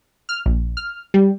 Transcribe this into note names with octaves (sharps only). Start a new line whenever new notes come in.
F6
A#1
F6
G3